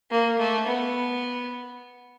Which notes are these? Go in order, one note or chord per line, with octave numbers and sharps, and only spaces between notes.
A#3
A3
B3